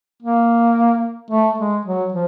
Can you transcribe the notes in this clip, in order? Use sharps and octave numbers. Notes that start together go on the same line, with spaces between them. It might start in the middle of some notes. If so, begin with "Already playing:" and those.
A#3
A3
G#3
F#3
F3